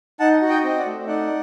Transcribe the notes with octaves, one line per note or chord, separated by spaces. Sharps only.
D#4 F#5 A5
F#4
D#5 G5
C4 D#5
D5 F#5
A3
D#4 D5 F#5